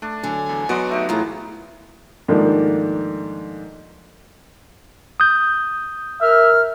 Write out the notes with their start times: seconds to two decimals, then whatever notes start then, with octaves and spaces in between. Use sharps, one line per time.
0.02 A3 D4
0.23 D3 F#3 G#5
0.49 E2
0.69 F#3 B3 F#4 D5 D#5 F#5 C6
0.89 A3 D#4 G4
1.09 A2 E3 B3 F4 G#4 A#4 A#5
2.28 G#2 D#3 F3 A3 A#3 D4
5.20 D#6 G6
6.21 A#4 E5 F6